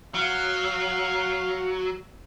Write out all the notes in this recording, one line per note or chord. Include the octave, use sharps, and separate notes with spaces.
F#3 F5